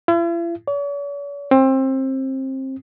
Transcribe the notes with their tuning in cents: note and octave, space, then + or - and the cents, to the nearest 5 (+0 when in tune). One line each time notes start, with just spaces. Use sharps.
E4 +45
C#5 +45
C4 +25